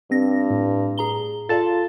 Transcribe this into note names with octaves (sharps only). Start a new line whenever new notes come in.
G2 C4 A#6
A2
G#4 A#5 G7
F4 A4 D5 F5 A5 A6